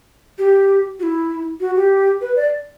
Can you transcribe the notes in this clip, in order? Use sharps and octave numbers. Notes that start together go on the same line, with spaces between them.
G4
F#4
E4
F#4
G4
B4
D5